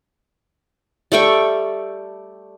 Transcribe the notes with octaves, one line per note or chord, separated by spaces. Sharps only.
G3 A3 G5 C#6